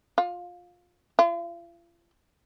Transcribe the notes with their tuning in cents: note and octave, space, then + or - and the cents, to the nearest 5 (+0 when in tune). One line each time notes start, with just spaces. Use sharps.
F4 +20
F4 -40